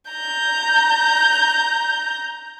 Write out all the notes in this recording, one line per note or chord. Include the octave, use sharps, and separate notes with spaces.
A#5 G6